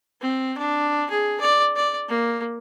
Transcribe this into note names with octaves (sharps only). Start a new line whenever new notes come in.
C4
D4
G#4
D5
D5
A#3